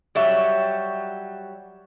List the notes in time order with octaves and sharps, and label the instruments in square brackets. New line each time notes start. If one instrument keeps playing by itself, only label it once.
[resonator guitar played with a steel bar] F#3 G3 C#5 E5